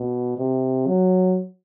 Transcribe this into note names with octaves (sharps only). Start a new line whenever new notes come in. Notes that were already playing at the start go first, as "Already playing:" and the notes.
Already playing: B2
C3
F#3